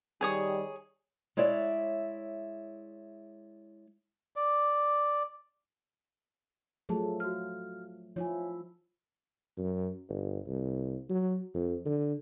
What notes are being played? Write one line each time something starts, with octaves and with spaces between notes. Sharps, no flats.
D#3 G3 G#4 C#5 D#6
G#3 E4 C#5 D5 E5
D5
F3 F#3 A3 G#4 A5
F#4 F5 F6
F3 E4 C#5 G#5
F#2
G1
C2
F#3
F2
D3